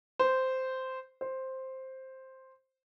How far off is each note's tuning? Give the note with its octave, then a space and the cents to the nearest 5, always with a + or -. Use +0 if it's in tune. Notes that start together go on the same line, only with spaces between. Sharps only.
C5 -10
C5 +5